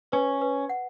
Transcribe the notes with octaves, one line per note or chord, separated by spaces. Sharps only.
C#4 B4
B4
F#5